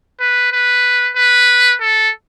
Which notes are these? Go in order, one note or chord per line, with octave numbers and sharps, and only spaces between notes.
B4
B4
B4
A4